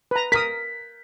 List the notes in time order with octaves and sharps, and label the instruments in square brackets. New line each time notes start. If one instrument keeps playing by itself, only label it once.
[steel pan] B4 A#5
[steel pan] A#4 D#6 [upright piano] B6